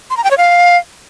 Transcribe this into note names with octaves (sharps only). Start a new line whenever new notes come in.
C6
A#5
G5
C#5
F5